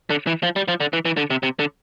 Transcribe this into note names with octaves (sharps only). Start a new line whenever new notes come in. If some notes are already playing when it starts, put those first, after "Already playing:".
D3
E3
F3
G3
F3
D3
E3
E3
D3
C3
C3
D3